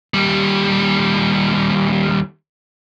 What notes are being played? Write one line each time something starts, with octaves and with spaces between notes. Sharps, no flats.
D#2 G3